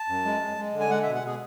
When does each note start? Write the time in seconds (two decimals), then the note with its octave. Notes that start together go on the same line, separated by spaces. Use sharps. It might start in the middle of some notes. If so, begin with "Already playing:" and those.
Already playing: A5
0.08 F#2
0.25 G#3
0.41 G#3
0.58 G#3
0.73 D3
0.80 G#5
0.90 G#3 F#5
1.02 E5
1.06 B2
1.15 F#5
1.23 B2 G#4